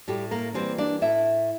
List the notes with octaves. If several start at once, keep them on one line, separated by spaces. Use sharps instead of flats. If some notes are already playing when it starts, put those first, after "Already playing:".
A2 G3 G4
A#3 A#4
E3 G3 A#3 C4 C5
D4 D5
A2 E4 E5